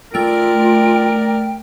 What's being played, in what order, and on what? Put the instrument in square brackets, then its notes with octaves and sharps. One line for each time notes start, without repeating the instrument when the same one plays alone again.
[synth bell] A3 F6 D7 [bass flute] F4 [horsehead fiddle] A#4 D5 [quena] G5